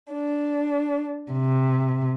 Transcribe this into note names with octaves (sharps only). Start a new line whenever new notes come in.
D4
C3